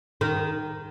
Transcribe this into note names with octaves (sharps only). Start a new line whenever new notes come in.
D#3